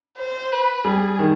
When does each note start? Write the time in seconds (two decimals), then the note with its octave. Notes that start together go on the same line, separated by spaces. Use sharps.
0.18 C5
0.52 B4
0.84 G3 G#4
1.19 D#3